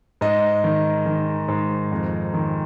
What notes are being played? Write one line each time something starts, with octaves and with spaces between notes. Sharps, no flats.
G#2 D#5
D#3
D#3
G#2
F2
D#3